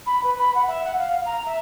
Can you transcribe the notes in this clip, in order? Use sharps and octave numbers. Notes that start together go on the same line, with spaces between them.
B5
B4
B5
F#5
E5
F#5
F5
F5
A#5
E5